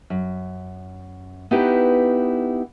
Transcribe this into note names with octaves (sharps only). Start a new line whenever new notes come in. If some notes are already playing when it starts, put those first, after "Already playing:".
F#2
B3 D#4 E4 G4 B4